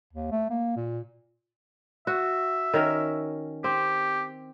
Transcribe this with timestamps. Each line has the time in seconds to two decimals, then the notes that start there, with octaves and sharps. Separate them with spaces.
0.13 D#2
0.32 A3
0.50 A#3
0.76 A#2
2.07 F#4 E5
2.74 D#3 C#4 A#4
3.64 C4 G4